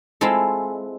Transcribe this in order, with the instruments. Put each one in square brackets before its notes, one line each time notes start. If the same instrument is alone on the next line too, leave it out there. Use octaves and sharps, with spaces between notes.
[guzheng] G#3 C4 E4 F4 A4